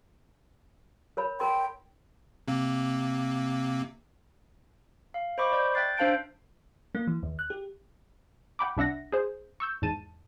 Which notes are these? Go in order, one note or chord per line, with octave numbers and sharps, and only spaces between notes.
A#4 C#5 B5
A#4 G5 C6
C3 A#3 C4
F5
C5 D#5 B5 C#6 D6
D5 G6
E5 G5 F#6 A6 C7
D4 C5 F5 A5 G6 D7
A#3
E3
D#2
F#6
G4
F#5 G5 B5 D6
C2 D4 E5 F#5 A#6
G#4 C5
C#6 E6 G6
E2 G#2 A5 D#7